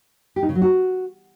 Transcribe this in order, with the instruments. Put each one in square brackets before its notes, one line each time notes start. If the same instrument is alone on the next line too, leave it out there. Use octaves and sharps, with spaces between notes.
[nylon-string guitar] G4
D#4
C#3
F#3
F#4